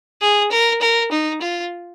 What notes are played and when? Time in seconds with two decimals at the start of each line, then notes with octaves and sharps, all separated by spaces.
0.21 G#4
0.52 A#4
0.81 A#4
1.11 D#4
1.41 F4